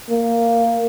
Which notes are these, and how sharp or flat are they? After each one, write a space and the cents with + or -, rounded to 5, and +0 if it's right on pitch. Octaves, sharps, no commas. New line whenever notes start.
A#3 -10